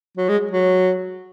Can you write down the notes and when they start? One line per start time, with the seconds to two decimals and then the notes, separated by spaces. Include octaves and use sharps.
0.18 F#3
0.29 G#3
0.51 F#3